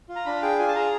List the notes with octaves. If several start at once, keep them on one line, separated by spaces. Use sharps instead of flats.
F4
A#5
D4 B5
G#4 G5
F4 G#5
A5
G#4 A#5